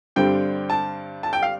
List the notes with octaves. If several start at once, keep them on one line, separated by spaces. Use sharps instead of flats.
G2 D3 G3 C4 G5
A5
A5
G5
F5